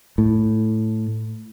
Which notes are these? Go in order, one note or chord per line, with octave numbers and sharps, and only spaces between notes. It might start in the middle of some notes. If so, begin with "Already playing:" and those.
A2